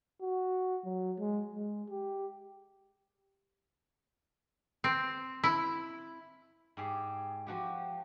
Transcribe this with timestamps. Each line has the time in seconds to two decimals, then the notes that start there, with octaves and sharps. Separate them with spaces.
0.22 F#4
0.85 F#3
1.19 G#3
1.56 G#3
1.90 G4
4.84 C4
5.43 E4
6.77 G#2 G4 G#4
7.47 F3 F#4 G4